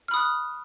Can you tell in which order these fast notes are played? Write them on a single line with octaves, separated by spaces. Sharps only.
F6 B5 D#6 F#6